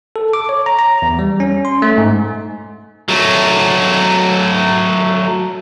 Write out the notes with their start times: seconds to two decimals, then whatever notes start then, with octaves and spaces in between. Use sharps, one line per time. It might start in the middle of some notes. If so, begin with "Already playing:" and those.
0.16 A4
0.33 D6
0.49 C#5
0.66 A#5
0.79 A#5
1.02 E2
1.19 G3
1.40 C#4
1.65 C6
1.82 A3
1.98 G#2
3.09 F#3 A3